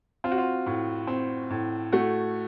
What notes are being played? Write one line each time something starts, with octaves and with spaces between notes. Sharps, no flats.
C4 F4
F#4
F4
A2
C4
A2
A3 F#4